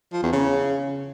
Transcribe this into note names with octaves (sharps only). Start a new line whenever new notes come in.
F3
E2
C#3